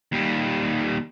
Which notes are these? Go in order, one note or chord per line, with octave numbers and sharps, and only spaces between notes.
D#2 G3